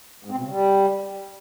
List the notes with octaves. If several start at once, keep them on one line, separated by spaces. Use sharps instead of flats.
G#2
C4
B2
C#3
G3